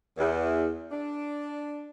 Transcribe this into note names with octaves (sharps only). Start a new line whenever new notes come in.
E2
D4